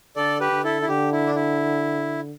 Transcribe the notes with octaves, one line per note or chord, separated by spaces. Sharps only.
D3 A4 D5
G4 B4
D3
E4 A4
E4
D3 G4
E4
D4
E4